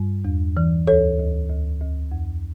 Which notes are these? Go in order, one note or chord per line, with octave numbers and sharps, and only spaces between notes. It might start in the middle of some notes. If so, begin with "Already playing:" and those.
Already playing: G2 G3
E2
E3
D2 A4 C#5
D2
D2
D2
F2